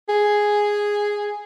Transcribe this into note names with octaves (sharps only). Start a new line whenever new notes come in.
G#4